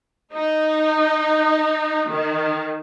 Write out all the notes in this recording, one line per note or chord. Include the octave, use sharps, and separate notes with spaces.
D#4
D#3